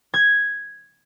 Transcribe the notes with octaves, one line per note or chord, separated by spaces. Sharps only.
G#6